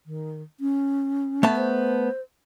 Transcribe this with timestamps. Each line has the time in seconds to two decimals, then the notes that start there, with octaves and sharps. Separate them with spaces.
0.06 D#3
0.60 C#4
1.43 A3 B3 A5
1.56 C5